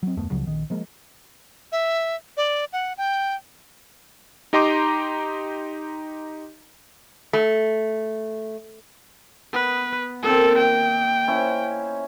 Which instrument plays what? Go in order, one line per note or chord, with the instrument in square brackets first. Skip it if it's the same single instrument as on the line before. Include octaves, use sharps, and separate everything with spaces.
[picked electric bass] F#3 C4
D#1 F#2 A3 B3
C#2 C#3 F3 F#3
A#1 D#3
F3 G#3 A#3
[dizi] E5
D5
F#5
G5
[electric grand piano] D#4 G4 D#5 A#5 C6 D6
[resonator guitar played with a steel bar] A3
[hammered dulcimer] B3 [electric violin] B4
[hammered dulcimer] A#2 D#3 [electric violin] C4 A4
[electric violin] G5
[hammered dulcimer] C#4 E4 C5